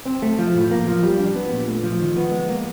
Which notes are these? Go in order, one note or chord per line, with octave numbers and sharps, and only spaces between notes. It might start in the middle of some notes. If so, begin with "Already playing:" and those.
C4
A3
F3
A2
A#3
F3
G3
D4
B3
A#2
A3
F3
D#3
B3
G#3
A#3